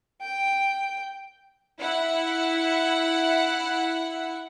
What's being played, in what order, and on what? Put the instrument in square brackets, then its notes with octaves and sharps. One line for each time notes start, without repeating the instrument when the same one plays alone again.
[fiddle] G5
[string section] E4 F#5